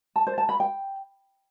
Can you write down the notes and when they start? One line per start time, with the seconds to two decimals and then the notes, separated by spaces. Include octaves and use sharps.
0.16 A5
0.27 C5
0.38 A5
0.49 B5
0.60 G5